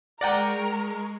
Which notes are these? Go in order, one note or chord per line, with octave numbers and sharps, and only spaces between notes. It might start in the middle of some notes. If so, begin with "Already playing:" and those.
G#3 A#4 D5 F#5 G5 A#5 C#6 A#6